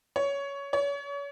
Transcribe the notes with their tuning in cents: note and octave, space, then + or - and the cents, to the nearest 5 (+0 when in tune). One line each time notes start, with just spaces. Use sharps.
C#5 +15
C#5 +35